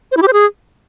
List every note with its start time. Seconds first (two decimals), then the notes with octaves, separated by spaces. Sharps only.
0.11 C5
0.17 E4
0.22 G4
0.28 C5
0.33 G#4